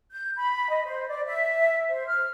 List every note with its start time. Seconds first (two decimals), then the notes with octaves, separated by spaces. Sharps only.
0.12 G6
0.36 B5
0.69 D#5
0.86 C5
1.08 D5
1.26 E5
1.89 C5
2.08 F6